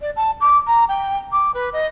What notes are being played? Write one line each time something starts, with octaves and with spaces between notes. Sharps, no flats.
D5
A5
D6
A#5
G5
D6
B4
D#5